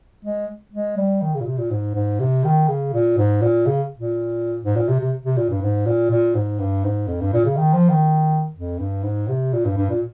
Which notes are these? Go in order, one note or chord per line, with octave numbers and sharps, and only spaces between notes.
G#3
G#3
G3
D#3
C#3
A#2
C3
A#2
G#2
G#2
C3
D#3
C#3
A#2
G#2
A#2
C#3
A#2
G#2
A#2
C3
C3
C3
A#2
G2
G#2
A#2
A#2
G#2
G2
G#2
F2
G2
A#2
C#3
D#3
F3
D#3
F2
G2
G#2
C3
A#2
G2
G2
A#2